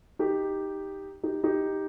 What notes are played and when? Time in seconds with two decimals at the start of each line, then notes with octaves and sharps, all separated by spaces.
0.19 D#4 G4
1.23 D#4 G4
1.44 D#4 G4